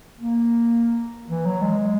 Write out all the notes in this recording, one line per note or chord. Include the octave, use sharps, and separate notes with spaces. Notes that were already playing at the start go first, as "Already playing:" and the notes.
A#3
E3
F#3
G#3